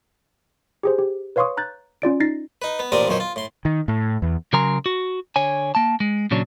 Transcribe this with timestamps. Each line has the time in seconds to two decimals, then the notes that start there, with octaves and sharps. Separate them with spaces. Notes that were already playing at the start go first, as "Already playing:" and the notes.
0.83 G4 G#4 C5
0.99 G4
1.36 B4 C#5 F5 C6 C#6 D#6
1.57 A#5 F#6 G6 A6
2.02 C#4 F4 D5 D7
2.20 D#4 A6 A#6 C7
2.62 D#4 B4
2.79 B3
2.92 A1 A#2 C4 D4 A#4 D#6
3.08 B1 F2 D#3 C#4 C5
3.20 F4
3.36 A2 C6
3.65 D#3
3.88 A2
4.22 E2
4.53 C#3 F#3 A#4 G#5 A#5 C6
4.86 F#4
5.36 D3 C#5 G#5
5.75 A#3 A5
6.00 G#3
6.31 A#2 C#3 F#3 C#4 D4